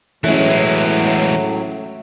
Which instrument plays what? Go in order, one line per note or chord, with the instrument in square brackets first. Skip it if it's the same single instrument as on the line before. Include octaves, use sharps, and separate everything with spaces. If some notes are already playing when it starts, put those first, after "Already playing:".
[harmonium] A2 F#3 [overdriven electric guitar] E3 G#3 [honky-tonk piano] A3 C#4 E4